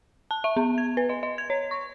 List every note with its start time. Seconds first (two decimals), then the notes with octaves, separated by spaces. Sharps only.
0.31 A5
0.44 E5
0.56 B3
0.78 G#6
0.97 B4
1.09 D#5
1.23 D#5
1.38 G#6
1.50 C#5
1.71 C#6